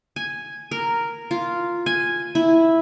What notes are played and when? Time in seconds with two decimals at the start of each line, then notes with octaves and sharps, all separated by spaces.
0.16 G#5
0.71 A#4
1.31 F4
1.86 G#5
2.35 E4